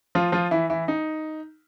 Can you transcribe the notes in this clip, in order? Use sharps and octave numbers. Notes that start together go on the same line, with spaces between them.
F3 F4
F3 F4
E3 E4
E3 E4
D#4